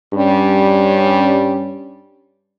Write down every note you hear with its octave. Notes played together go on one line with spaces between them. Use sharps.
G2 G3 C#4